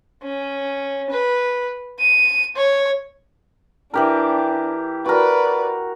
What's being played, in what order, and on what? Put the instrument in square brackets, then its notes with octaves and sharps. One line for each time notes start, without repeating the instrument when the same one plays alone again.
[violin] C#4
B4
D#7
C#5
[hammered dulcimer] E3 G4 A#4 [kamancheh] D4
[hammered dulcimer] F#4 A#4 [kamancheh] B4 D5